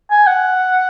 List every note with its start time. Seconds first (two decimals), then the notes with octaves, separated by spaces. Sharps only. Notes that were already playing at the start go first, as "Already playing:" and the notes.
0.10 G#5
0.27 F#5